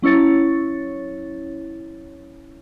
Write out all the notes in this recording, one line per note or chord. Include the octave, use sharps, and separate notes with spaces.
F#3 C#4 E4 C#5 A6